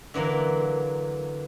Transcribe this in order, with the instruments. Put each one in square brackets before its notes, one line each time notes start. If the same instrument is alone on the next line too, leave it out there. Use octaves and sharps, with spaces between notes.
[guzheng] D3 E3 F#3 A#3